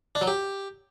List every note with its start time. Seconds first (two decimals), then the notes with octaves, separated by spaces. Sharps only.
0.15 D4
0.21 F#3
0.27 G4